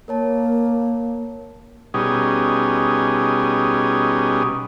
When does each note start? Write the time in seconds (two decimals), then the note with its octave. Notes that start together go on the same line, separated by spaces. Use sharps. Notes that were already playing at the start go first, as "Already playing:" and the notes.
0.08 A#3 A#4 C#5 A5
1.94 B2 G3 C#4 D#4 G#4